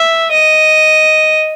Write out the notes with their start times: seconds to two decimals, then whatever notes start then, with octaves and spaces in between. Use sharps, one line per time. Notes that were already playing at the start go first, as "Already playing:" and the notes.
Already playing: E5
0.32 D#5